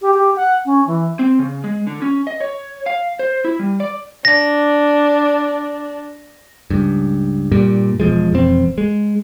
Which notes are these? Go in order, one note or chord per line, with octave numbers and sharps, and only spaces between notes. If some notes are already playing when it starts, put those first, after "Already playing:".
G4
G4
F#5
C#4
E3
C4
C#3
G#3
D3
C#4
D#5
C#5
F5
C5
E4
G3
D5
D4 A#6
C#2 G2
G2 A#2 G3
E1 B2 F3 G#3
E1 F2 C4
G#3